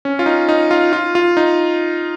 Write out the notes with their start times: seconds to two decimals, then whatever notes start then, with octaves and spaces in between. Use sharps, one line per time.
0.05 C#4
0.19 F4
0.26 D#4
0.48 D#4
0.71 F4
0.93 F4
1.15 F4
1.37 D#4